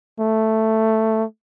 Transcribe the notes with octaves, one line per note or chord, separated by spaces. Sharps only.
A3